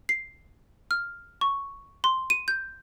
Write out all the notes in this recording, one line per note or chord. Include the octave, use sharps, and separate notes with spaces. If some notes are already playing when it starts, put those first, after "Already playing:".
C7
F6
C#6
C6
D#7
G6